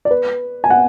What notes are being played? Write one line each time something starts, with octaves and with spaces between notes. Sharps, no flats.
D5
B4
G#5
F#5